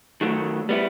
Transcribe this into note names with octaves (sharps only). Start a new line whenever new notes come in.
D#3 F#3 A3
G3 B3 E4